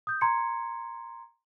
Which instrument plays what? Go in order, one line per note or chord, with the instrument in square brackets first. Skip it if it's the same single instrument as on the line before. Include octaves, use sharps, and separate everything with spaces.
[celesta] D#6 G6
A#5 C6 G#6 C#7